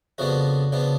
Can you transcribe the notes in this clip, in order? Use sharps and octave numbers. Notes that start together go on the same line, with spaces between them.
F2 C#3 F3 B3 D4 F#4
C#3 F3 B3 D4